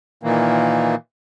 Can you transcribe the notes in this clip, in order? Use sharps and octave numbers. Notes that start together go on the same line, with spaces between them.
A#2 D#3 E3 A#3